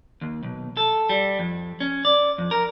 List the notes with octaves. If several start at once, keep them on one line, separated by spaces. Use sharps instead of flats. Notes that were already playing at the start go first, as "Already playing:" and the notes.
D#2
B1
A4
G3
F2
C#4
D5
F2
A#4